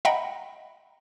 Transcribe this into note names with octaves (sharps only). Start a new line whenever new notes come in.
D#5 E5 F#5 G5 A#5 B5